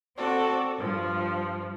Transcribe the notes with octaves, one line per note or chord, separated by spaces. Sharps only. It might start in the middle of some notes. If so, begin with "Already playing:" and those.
C4 F#4 A4 D5
G2 F3